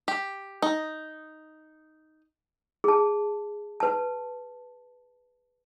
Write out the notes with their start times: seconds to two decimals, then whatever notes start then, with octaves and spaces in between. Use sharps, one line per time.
0.08 G4
0.62 D#4
2.84 G#4 A5
3.80 B4 A5